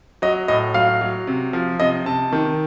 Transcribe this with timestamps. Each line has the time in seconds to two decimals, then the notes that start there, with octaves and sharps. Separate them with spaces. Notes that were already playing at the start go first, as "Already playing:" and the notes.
0.22 F#3 D#5
0.48 A2 D#5
0.74 F#3 F5
1.01 F#3
1.27 C3
1.53 F3
1.80 C3 D#5
2.06 C3 A5
2.32 D#3